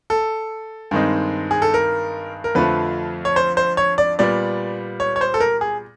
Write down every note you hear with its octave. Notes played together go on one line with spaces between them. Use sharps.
A4
G2 D#3 G#3 C4 D#4
G#4
A4
A#4
A#4
F2 D3 F3 A3 B4
C#5
C5
C5
C#5
D5
A#2 G3 B3 D5
C#5
C#5
C5
A4
A#4
G#4